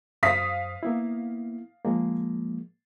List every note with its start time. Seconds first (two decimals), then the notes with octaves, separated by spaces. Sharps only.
0.23 F#2 C5 F5 D#6 B6
0.83 A#3 B3 E4
1.85 F3 G#3 A#3